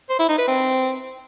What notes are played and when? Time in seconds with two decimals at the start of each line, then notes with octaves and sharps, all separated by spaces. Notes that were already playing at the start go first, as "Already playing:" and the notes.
0.09 C5
0.19 E4
0.29 D#4
0.38 B4
0.48 C4